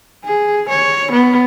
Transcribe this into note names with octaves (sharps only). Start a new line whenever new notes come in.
G#4
C#5
B3